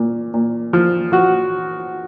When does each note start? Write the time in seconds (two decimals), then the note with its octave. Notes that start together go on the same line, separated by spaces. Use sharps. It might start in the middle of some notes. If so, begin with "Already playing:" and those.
Already playing: A#2
0.34 A#2
0.73 F3
1.12 F3 F#4